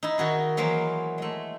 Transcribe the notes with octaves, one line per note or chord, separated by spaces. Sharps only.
D#4 E4
D#3 F#4 G#4
E3 F#3 A#3 C5
G#3 A3